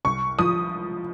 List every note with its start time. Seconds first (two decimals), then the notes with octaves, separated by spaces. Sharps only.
0.05 C2 C#6
0.39 F3 D#6